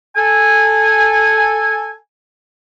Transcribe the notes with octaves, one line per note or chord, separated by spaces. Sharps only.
A4 G#5